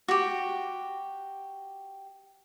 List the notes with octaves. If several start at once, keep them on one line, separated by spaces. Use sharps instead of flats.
F#4 G4